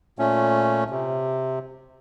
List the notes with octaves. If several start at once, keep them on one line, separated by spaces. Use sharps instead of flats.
A#2 A3 C#4
C3